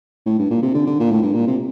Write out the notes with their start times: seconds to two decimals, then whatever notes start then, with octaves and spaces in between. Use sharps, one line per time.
0.26 A2
0.39 G2
0.51 A#2
0.63 C3
0.74 D3
0.87 D3
1.00 A#2
1.12 A2
1.23 G2
1.35 A#2
1.48 C3